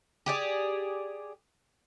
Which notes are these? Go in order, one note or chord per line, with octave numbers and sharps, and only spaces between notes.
G4 G#4 D5